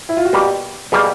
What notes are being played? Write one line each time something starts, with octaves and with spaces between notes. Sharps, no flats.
E4
F4
F#4
B2 G3 A#3 G4
B2 G3 A#3 G#4